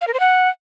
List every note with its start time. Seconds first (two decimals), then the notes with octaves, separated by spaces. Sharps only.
0.01 F5
0.08 A#4
0.14 C5
0.20 F#5